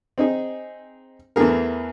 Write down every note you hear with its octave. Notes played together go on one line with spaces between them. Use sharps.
C4 D#4 G#4
E2 E3 A3 G#4 A#4